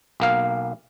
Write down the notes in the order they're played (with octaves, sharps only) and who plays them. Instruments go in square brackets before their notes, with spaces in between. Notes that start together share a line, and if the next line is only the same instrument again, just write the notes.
[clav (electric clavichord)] B1 A#3 F5